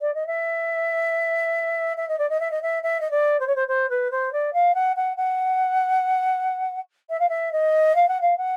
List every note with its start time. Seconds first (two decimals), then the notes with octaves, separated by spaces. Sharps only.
0.01 D5
0.15 D#5
0.27 E5
1.97 E5
2.09 D#5
2.18 D5
2.29 D#5
2.40 E5
2.51 D#5
2.62 E5
2.83 E5
3.01 D#5
3.11 D5
3.40 C5
3.47 C#5
3.56 C5
3.68 C5
3.90 B4
4.11 C5
4.32 D5
4.53 F5
4.75 F#5
4.96 F#5
5.17 F#5
7.10 E5
7.20 F5
7.29 E5
7.52 D#5
7.95 F5
8.08 F#5
8.21 F5
8.38 F#5